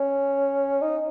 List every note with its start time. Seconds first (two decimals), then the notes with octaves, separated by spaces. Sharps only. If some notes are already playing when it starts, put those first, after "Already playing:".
Already playing: C#4
0.82 D#4